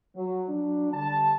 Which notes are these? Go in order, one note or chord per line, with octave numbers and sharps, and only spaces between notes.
F#3
F#3 D4
D3 G3 A5